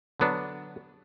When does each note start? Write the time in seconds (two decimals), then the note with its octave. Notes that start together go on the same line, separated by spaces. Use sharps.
0.20 D3 F#3 B3 D4